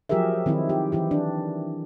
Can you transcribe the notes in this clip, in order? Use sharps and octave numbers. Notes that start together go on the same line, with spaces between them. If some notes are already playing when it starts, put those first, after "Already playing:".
F3 F#3 G4 G#4 A#4 E5
D#3 C4 D#4 E4
G4
E3 E4 G4
D4